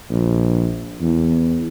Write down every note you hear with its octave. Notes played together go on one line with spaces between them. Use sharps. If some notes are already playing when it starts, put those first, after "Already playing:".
A#1
E2